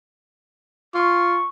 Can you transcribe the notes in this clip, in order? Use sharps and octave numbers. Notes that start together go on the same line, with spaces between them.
F4 C#6